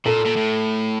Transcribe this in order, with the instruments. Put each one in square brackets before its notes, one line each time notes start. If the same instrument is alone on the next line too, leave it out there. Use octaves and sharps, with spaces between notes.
[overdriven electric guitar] A#2 [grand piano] A4
[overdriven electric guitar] A#2
A2